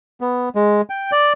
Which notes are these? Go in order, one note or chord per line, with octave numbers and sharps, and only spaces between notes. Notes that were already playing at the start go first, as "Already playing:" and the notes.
B3
G#3
G5
D5